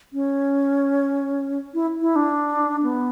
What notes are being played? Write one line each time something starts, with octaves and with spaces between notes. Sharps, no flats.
C#4
E4
E4
D4
B3